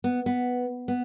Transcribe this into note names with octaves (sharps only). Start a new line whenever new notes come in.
B3
B3
B3